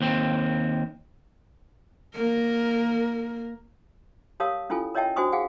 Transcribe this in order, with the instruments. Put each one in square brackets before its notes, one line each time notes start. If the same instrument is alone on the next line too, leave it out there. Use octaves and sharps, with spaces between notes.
[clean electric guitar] D#2 C4
[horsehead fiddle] A#3 A#4
[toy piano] G4 A#4 C#5 F5 A5 D#6
C#4 E4 F4 A4 G#5
A#4 C#5 D#5 E5 G5 A5
D4 F#4 C5 G#5 C#6 D#6
G#4 F5 F#5 G#5